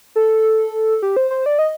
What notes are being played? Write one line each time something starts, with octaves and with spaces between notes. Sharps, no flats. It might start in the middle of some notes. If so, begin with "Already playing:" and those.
A4
G4
C5
C5
D5
D#5